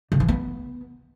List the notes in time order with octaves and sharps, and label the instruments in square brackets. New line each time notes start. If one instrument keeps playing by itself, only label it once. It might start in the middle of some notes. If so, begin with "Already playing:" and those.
[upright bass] D3
E3
B3